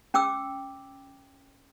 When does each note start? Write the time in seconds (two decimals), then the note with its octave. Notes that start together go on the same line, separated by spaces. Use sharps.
0.14 C#4 G5 D6 E6